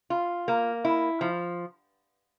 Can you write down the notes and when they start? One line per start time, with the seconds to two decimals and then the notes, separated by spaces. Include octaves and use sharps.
0.10 F4
0.48 A#3
0.85 E4
1.21 F3